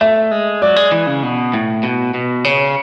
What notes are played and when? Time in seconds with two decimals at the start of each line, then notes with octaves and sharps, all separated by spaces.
0.01 A3 E5
0.31 G#3
0.62 F#3 D5
0.76 G#3
0.92 E3
1.07 C#3
1.23 B2
1.54 A2
1.83 B2
2.14 B2
2.44 C#3 C#5